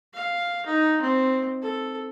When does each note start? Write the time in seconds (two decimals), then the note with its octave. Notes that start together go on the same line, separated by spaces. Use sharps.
0.13 F5
0.66 D#4
1.01 C4
1.62 A4